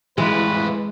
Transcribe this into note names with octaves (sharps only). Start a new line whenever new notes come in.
F2 A2 E3 G#3 B4